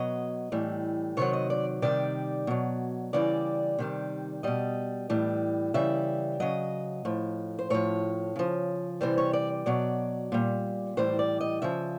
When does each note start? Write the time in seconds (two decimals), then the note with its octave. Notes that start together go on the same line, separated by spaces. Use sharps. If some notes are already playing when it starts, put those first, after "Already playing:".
Already playing: B2 F#3 D#5
0.52 A2 E3 G3
1.17 C3 D#3 F#3 C#5
1.33 D#5
1.50 D5
1.82 C3 D#3 G3 D5
2.47 B2 F#3
3.13 C#3 E3 G3 D5
3.78 C3 D#3 G3
4.43 B2 G3 D#5
5.10 A2 E3 G3
5.74 C#3 E3 G3 E5
6.40 C#3 F#3 D#5
7.05 A2 F3
7.59 C5
7.70 A2 F3 C#5
8.36 C#3 F3
9.01 C3 E3 G3 C5
9.18 C#5
9.33 D5
9.66 B2 F#3 D5
10.32 A#2 G3
10.97 A2 E3 G3 C5
11.19 D5
11.41 D#5
11.62 C#3 F3 E5